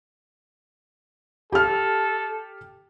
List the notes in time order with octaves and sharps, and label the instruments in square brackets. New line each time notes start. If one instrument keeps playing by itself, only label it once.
[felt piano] G4 F6 [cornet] A4